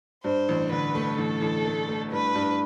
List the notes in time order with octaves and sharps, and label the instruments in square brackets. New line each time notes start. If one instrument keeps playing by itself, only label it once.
[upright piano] G2 [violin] C5
[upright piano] A1
[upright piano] D3 [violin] B4
[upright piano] A3
[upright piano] A1 [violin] A4
[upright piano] A1
A3
A3
[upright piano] G2 [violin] B4
[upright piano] G2